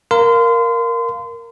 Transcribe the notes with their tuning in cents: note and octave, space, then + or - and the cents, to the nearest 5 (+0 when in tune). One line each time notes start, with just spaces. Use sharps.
A#4 +0 F5 +0 C6 -35